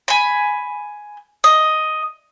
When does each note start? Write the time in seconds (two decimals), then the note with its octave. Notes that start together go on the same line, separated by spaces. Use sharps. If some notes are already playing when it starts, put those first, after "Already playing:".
0.08 G#5 B5
1.44 D#5